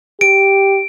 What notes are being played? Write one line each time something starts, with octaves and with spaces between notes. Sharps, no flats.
G4 D7